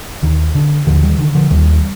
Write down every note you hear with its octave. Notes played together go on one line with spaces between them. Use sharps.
D#2 D#3
D3
D#2 D3 F3
D#3 G3
D3 D#3
D3 F3
D#2 D#3 G3